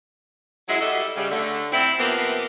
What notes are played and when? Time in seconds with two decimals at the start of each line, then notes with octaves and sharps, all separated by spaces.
0.68 F#2 F#3 G#3 E4
0.81 G3 F#4 A4 D#5 E5
1.15 C#3 G3
1.31 D3 A3
1.72 C4 E4
1.98 C3 F3 A#3 B3